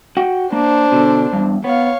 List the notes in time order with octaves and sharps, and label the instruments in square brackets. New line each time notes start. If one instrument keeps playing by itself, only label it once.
[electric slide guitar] F#4 F#5 G5
[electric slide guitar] A#3 [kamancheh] D4 C5
[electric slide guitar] B2 D3
E2 G2
[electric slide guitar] B3 [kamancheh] C#5 F5